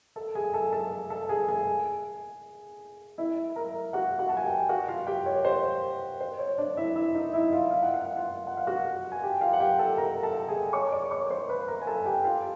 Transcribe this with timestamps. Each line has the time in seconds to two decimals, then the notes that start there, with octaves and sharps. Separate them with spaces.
0.16 A4 A5
0.35 G#4 G#5
0.54 A4 A5
0.73 A4 A5
1.10 A4 A5
1.29 G#4 G#5
1.49 G#4 G#5
3.18 E4 E5
3.56 A#4 A#5
3.93 F#4 F#5
4.19 F#4 F#5
4.29 A5
4.37 G#5
4.44 G4 G5
4.69 F#4 F#5
4.88 F4 F5
5.07 G4 G5
5.26 C#5
5.45 C5
6.21 C5
6.39 C#5
6.58 D4 D5
6.77 E4 E5
6.96 E4 E5
7.15 D#4 D#5
7.33 E4 E5
7.52 F4 F5
7.71 F5
7.82 F#5
7.94 F5
8.05 F#5
8.16 F4 F5
8.47 F#5
8.57 F5
8.67 F#4 F#5
9.12 G#5
9.23 G4 G5
9.41 F4 F5
9.53 F#5
9.60 G4 G5
9.79 A4 A5
9.98 A#4 A#5
10.23 A4 A5
10.48 G#4 G#5
10.73 C#5 C#6
10.92 D5 D6
11.11 C#5 C#6
11.30 C5 C6
11.49 B4 B5
11.68 A#4 A#5
11.82 G#5
11.87 A4 A5
12.05 G4 G5
12.25 F4 F5